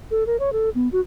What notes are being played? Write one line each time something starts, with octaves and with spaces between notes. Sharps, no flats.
A4
A#4
C#5
A4
B3
F#4